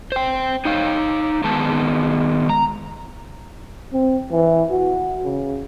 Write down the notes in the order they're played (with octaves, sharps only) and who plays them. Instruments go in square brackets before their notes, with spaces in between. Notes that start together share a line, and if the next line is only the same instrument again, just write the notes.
[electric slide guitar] C5 G5
D#4 C#5 F5
D#3 G#3 B3 A5
A#5
[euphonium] C4
E3
F#4
C#3